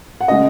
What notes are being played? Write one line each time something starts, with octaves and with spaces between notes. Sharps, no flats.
F#5
C#3 G#3 D#5